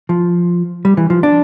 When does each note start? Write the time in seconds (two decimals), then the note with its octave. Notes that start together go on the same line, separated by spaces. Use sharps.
0.09 F3
0.85 G3
0.97 E3
1.10 F3
1.23 D4